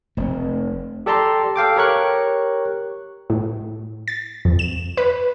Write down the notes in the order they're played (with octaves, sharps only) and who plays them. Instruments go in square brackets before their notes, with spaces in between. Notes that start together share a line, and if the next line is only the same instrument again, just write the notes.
[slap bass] F1 [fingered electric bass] A3 C4
[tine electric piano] G4 A4 D5 A5 A#5 C6
A4 F5 G5 D6
G4 A#4 C#5 C#6 F#6
[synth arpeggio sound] A2
A6
F2
E7
B4